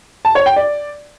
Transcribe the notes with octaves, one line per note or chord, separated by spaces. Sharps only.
A5
C#5
G5
D5